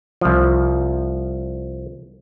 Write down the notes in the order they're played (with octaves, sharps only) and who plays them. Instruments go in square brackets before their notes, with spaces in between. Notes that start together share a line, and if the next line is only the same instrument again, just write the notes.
[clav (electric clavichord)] C2 F3